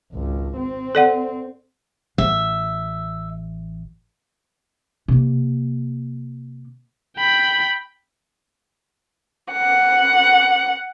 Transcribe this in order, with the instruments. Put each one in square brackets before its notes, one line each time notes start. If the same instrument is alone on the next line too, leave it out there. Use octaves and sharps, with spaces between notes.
[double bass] G#1 C#2
C4
[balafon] A4 D5 F#5
[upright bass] A1 [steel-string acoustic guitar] E5
[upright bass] C3 A#3
[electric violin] G5 B5
[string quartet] F#5